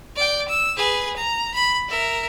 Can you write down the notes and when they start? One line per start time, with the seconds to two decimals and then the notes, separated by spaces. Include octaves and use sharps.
0.16 D5 G5
0.48 E6
0.77 G#4 B4
1.16 A#5
1.54 B5
1.89 A#4 E5